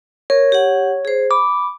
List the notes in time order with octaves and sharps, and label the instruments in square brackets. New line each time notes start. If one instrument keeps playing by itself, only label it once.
[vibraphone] A#4 [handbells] C#5
[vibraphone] G4 F#5
G#4 C5
[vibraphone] B5 [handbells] D6